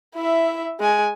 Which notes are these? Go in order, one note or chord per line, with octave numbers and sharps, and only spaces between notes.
E4 E5
G#3 G#5